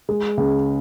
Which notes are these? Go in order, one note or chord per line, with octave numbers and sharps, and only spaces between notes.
G#3
C#2